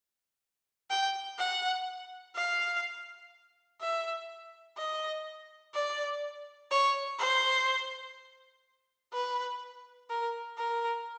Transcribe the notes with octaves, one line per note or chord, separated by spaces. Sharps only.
G5
F#5
F5
E5
D#5
D5
C#5
C5
B4
A#4
A#4